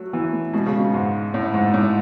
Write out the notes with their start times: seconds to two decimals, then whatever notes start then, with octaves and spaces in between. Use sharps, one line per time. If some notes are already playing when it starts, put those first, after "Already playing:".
Already playing: F#3 A3
0.13 E3 B3
0.33 A3
0.53 B2 G#3
0.66 C#3
0.79 B2
0.94 G#2
1.34 A2
1.54 G#2
1.74 A2